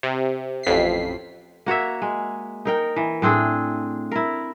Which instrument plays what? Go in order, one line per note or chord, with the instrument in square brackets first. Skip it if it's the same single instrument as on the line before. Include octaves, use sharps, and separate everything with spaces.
[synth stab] C3
A1 F2 B6 C7
[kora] A#3 F#4 C#5 E5
G#3
D#4 A#4 G5
E3
A2 C4 D4 G#4
E4 A#4